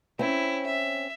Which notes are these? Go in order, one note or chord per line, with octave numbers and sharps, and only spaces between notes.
C4 C#4 E4
E5